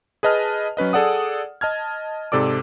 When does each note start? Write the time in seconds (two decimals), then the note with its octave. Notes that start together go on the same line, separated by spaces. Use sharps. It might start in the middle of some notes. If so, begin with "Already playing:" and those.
0.23 G#4 B4 D#5 A5 F6
0.77 F#3 C#4 B4 D#5
0.93 G#4 A4 D5 F#5 D#6
1.61 D#5 A5 F6 G#6
2.32 G#2 C3 A4 D5 D6